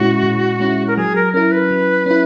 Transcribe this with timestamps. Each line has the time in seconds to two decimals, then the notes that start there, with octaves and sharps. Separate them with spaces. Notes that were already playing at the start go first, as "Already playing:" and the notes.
Already playing: A#2 G#3 C#4 E4 F#4
0.23 A#2
0.60 G#3 C#4 E4
0.88 A#4
0.97 F#3 G#4
1.15 A#4
1.33 C#4 E4 A#4
1.51 B4
1.71 F#3
2.06 C#4 E4